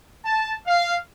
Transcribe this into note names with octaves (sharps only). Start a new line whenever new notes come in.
A5
F5